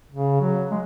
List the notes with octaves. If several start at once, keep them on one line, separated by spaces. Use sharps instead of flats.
C#3
F#3
G#3